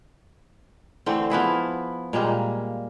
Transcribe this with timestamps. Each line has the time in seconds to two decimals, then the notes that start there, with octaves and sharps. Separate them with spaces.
1.06 D3 E3 A3 C4
1.30 F3 B3 E4 G#4
2.13 A#2 G3 G#3 A#3